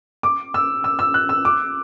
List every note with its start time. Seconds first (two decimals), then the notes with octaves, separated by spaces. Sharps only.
0.23 D6
0.54 E6
0.84 E6
0.99 E6
1.14 F#6
1.29 E6
1.45 D6